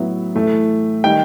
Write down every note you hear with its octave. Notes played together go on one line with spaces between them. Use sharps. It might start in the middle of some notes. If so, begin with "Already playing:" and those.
Already playing: A2 F#3 B3 E4
A2 E3 A3
D#3 G3 D#4 G5